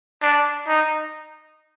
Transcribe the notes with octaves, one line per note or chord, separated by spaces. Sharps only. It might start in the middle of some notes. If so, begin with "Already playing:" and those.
D4
D#4